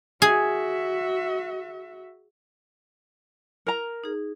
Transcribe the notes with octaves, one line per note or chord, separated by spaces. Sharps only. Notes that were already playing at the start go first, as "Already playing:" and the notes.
F#4 G#4 E5
A#4 A#5
D#4 G#4